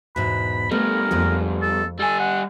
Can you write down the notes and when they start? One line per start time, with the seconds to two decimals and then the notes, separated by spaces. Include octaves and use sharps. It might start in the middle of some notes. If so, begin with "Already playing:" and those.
0.16 E2 G#2 B2 B5
0.71 G3 A3 B3 A#4
1.11 F2 G#3 F4
1.62 A4
1.99 G3 A4 G#5
2.19 F#5